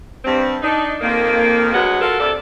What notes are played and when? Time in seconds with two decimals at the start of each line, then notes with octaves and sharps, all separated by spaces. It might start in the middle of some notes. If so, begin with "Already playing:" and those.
0.24 G2 C4
0.62 D4 D#4
1.01 F2 D#3 A#3
1.73 D2 F#3 G#3 B4 F#5
2.01 F4 F#4 A4 A#4
2.19 D2 C3 A4 D5